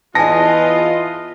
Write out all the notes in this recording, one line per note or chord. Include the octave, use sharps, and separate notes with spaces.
E2 E4 F4 B4 D#5 G#5 A5 A#6